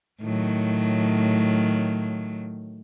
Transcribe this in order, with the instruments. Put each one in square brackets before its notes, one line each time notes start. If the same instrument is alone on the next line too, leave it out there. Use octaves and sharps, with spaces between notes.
[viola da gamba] A2 D#3 F#3